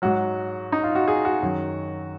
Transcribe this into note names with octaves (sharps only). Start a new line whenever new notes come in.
G#2 F#3 F#4
D#4
F4
F#4
G#4
F#4
F#2 D#3 F#3